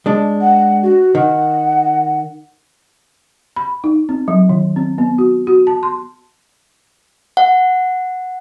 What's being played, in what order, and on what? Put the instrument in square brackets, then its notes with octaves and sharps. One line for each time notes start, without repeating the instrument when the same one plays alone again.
[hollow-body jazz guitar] G#3 D4
[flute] F#5
F#4
[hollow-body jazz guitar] D#3 [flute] F#5
[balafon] B5
D#4
C4
F#3
D#3
C4
B3
F#4
F#4
A5
C6
[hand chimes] F#5